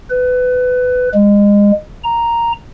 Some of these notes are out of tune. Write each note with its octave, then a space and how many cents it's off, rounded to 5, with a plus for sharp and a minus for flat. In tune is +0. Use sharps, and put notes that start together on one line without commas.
B4 +20
G#3 -30
A#5 +0